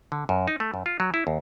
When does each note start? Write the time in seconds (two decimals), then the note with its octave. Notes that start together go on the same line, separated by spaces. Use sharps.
0.12 D3
0.29 F#2
0.48 D#4
0.60 A3
0.74 F#2
0.86 F4
1.00 F#3
1.14 E4
1.27 D#2